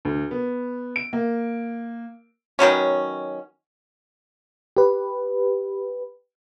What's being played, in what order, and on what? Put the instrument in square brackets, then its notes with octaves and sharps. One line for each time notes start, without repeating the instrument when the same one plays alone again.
[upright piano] D2
B3
D7
A#3
[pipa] D#3 F#3 B3 C#4
[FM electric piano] G4 B4